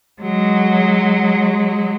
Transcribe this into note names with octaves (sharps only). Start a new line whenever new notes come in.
F#3 G#3